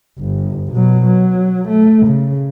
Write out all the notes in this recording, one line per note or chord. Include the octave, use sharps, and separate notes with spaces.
G1
B2 F#3
F#3
A3
C#3